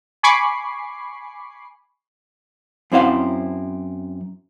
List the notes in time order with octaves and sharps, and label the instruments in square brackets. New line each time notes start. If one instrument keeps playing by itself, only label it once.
[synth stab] G#5 B5 C#6 D6 C7
[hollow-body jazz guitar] F#2 C4 E4 C5 F5 F#5